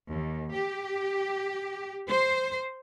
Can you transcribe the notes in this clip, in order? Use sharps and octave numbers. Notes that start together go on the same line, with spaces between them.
D#2
G4
C5